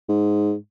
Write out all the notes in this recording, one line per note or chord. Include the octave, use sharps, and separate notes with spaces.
G#2